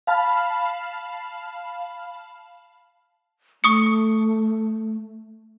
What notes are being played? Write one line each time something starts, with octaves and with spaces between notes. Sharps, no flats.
F5 A5 B5 F6
A3 C#6 D#6 C#7